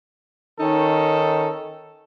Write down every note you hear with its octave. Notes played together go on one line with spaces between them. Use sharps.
D#3 C#4 D#4 A4